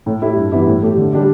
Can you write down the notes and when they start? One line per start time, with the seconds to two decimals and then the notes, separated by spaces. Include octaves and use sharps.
0.06 A2
0.22 A3 E4 G4
0.36 G2
0.52 E3 B3 E4 G4
0.67 A2
0.82 A3 G4
0.97 D3
1.13 G3 D4 G4